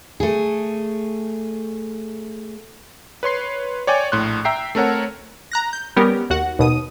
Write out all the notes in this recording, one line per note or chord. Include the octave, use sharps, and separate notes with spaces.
A3 G#4
B4 C#5 C6 C7
C#5 D5 G5 G#5
A#1 A2 C6 F#6
E5 G5 A#5 C7
A3 C4 A4 A#4 C#5 F#5
A#5 F#6 A#6
G6
G3 B3 C#4 G4 A#4
D#2 F#4 F#5
D#2 B2 D#6 D#7